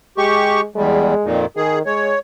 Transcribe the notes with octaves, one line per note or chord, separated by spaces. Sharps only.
G#3 G4 C#6
E2 G3 G#3
F2 A#2 D#3
D#3 G#4
G#3 C#5